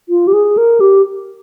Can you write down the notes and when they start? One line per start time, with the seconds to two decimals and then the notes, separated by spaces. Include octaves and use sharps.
0.09 F4
0.27 G4
0.33 G#4
0.57 A#4
0.80 G4